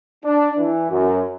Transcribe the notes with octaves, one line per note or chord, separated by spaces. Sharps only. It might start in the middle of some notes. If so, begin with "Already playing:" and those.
D4
E3
F#2